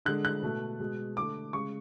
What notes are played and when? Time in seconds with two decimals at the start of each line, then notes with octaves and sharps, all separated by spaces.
0.06 D3 G#3 F#6
0.25 F#6
0.43 B2 A3
0.80 B2 G#3
1.17 D3 A3 D6
1.53 C#3 G#3 C#6